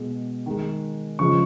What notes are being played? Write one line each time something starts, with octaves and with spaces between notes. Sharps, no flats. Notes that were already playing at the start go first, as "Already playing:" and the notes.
Already playing: B2 G#3
D#3 G#3
C#3 F3 G#3 C#6